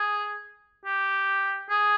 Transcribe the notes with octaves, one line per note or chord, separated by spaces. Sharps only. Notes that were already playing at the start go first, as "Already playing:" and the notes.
Already playing: G#4
G4
G#4